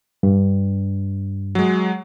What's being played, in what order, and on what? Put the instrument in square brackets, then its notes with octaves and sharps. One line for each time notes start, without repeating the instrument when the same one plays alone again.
[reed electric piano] G2
[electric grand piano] F#3 G#3